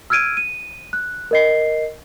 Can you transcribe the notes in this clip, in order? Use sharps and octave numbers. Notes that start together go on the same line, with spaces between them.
E6 F6 G#6 D7 D#7
D#7
F#6
A#4 D#5 C7